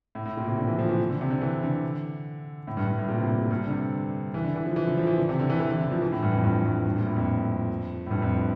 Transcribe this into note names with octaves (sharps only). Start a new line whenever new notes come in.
A2
A2
A#2
C3
D3
E3
F3
E3
D3
C3
D3
E3
D3
A2
G2
G2
A2
A#2
C3
C3
A#2
G2
D3
C3
E3
D3
E3
F3
E3
D3
F3
E3
D3
C3
D3
E3
E3
E3
D3
F3
E3
A2
G2
F2
G2
G2
G2
A#2
A2
F2
A2
G2
F2